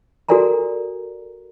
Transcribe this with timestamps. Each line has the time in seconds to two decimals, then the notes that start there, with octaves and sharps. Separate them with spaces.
0.29 F#4 A4 A#4 D5 G#5 A#5